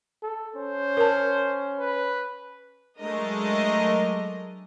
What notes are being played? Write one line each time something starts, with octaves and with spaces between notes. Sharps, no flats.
A4
C#4 C5
A#4 A5
B4
F#3 G#3 A3 D4 A#4 D#5